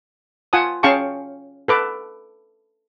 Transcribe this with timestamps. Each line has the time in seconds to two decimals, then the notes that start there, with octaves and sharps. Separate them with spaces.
0.53 F4 F#5 G#5 A5 D#6
0.83 C#4 G#4 F5 G5 A5 C#6
1.68 A4 B4 D6